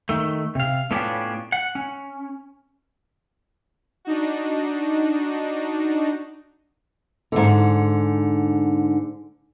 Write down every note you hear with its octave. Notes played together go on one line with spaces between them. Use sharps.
D#3 A3
C3 F5
A2 B3 C#4 D4 F4 G4
F#5
C#4
D4 D#4 F#4
G#2 D3